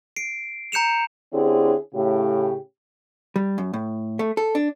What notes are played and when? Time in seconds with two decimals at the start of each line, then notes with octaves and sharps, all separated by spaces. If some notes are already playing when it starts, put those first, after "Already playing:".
0.16 C7 D7
0.72 A#5 G6 C#7 E7 F7
1.33 D3 C4 C#4 E4 G4 G#4
1.94 A2 C#3 G4
3.36 G3
3.58 F#2
3.73 A2
4.19 A3
4.37 A4
4.55 D4